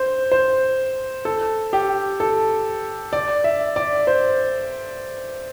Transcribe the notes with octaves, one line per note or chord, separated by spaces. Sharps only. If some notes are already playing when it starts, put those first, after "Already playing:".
Already playing: C5
C5
A4
G4
A4
D5
E5
D5
C5